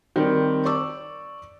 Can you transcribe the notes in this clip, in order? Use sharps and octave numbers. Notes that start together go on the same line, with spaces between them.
D#3 G3 C4
D5 C#6 D6 E6